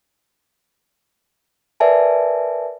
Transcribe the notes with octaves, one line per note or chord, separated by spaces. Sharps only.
A#4 B4 D5 E5 G#5 A5